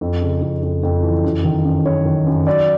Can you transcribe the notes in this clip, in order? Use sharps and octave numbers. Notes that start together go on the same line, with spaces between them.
F2
C#3
F2
F2
F2
E3
F#2
D#3
F#2
F#2 C#5
D#3
F#2
F#3 D5